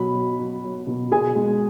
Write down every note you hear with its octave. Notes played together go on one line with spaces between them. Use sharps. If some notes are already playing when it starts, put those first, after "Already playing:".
Already playing: B2 F#3 B5
F#3
F#3
F#3
B2
B2 G#4 G#5
G#3